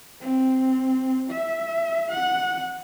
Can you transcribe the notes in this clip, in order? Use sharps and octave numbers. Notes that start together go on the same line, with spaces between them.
C4
E5
F#5